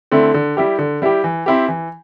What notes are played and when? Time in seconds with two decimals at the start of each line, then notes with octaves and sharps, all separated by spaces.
0.12 D3 A3 C4 E4
0.34 D3
0.57 G3 E4 G4
0.79 D3
1.02 G3 E4 G4
1.24 E3
1.46 C4 E4 G4
1.68 E3